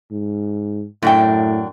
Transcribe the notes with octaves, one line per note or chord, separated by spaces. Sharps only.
G#2
F#2 A2 D4 G5